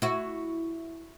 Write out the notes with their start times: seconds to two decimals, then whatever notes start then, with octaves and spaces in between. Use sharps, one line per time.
0.02 E4 F#4